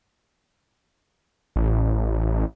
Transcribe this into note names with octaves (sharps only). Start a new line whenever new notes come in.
A1